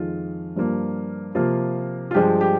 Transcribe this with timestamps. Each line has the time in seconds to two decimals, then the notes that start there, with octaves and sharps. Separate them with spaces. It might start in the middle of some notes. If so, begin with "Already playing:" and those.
Already playing: F2 D#3 G#3 F4
0.56 G2 F3 A#3
1.35 C3 F3 A#3 F4
2.11 F4
2.14 G2 F3 G#3 G4
2.41 G4